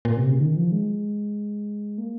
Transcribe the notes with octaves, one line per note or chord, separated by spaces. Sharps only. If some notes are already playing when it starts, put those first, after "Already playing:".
A#2
C3
C#3
D#3
F3
G#3
A#3